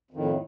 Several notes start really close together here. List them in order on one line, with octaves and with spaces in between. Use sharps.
F2 D#3 A2